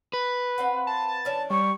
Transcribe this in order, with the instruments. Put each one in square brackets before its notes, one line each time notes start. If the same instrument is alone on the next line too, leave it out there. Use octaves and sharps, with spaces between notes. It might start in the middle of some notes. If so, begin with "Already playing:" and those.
[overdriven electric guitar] B4
[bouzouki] C4 F5 F#5
[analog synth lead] A5
[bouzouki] E3 C#4 D4
[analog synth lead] G3 [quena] C#6